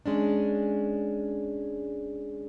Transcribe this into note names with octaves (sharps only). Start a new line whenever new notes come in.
G#3 C#4 D4